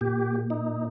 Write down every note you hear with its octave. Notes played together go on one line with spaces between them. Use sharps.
A#2 G4
D#4